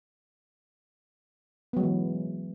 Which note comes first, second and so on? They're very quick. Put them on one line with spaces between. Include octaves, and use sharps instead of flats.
B3 F#3 G#3 E3